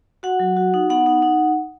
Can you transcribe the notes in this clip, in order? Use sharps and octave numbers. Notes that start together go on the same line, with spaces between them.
F#4 F#5
F#3
F#4
D#4
B3 F#5
D#4
D#4